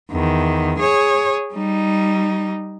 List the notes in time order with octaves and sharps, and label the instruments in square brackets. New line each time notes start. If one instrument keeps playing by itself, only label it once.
[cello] E2 D#3
G#4 C#5
G3 D#4